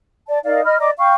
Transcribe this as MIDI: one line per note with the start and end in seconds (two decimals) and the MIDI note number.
0.28 0.39 74
0.28 0.39 81
0.44 0.63 63
0.44 0.63 70
0.44 0.63 74
0.44 0.63 77
0.64 0.77 75
0.64 0.77 83
0.64 0.77 89
0.80 0.91 74
0.80 0.91 75
0.80 0.91 82
0.80 0.91 86
0.98 1.15 77
0.98 1.15 79
0.98 1.15 85